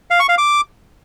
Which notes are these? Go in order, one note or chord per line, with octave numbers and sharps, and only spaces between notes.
F5
C#6
F5
D6